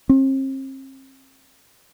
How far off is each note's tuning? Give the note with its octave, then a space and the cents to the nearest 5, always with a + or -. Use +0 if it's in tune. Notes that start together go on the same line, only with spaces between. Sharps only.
C4 +40